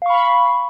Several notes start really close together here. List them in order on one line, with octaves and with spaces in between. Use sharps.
F5 C#6 B5